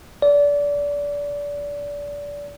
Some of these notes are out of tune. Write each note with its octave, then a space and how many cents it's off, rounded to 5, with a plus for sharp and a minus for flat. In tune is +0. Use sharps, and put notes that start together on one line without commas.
D5 -25